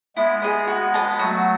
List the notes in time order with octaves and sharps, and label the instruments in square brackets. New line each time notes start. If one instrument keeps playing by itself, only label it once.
[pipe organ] G#3 B3 [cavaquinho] E4
[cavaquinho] G#4 D#5
F#4
B4 D#5 A5
[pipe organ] F#3 A3 [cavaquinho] F#4